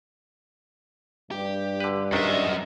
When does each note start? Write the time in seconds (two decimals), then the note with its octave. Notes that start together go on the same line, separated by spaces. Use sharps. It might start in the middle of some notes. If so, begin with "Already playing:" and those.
1.31 G2 G4
1.80 D3 B4
2.12 A#1 F#2 D#3 D4 D#5 E5